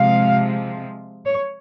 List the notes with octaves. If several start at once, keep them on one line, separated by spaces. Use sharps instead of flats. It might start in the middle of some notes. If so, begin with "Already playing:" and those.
Already playing: C3 F3 G#3 F5
C#5